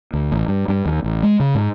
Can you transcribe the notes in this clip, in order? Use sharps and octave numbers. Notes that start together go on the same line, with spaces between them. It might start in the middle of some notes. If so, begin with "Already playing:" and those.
D2
A1
G2
G2
D#2
A1
G#3
C#3
G#2